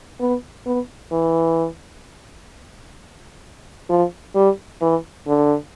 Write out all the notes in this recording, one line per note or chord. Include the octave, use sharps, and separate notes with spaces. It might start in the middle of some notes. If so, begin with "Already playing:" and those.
B3
B3
E3
F3
G3
E3
D3